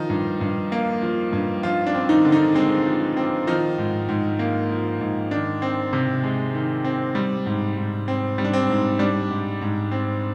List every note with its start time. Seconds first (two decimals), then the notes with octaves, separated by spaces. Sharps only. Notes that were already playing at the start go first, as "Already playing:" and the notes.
Already playing: D#3 F3 D#4
0.10 G2
0.41 G2
0.72 A#3
1.02 F3
1.33 G2
1.63 F3 F4
1.87 D4
1.95 C4
2.09 D#3 D#4
2.25 D3
2.32 D#3 D#4
2.55 G#3 C4
2.86 F3
3.17 C4
3.47 D#3 F3 D#4
3.78 G#2
4.09 G#2
4.39 A#3
4.70 F3
5.01 G#2
5.31 D#3 D4
5.62 C4
5.93 C3
6.24 G#3
6.55 D#3
6.84 C4
7.15 G3
7.46 G#2
7.77 G#2
8.08 C4
8.38 G3
8.45 D4
8.53 C4
8.69 G#2
8.99 G3 D4
9.30 G#2
9.61 G#2
9.91 C4